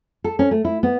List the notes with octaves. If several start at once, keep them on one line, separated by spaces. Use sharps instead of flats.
A4
C#4
A3
E4
B3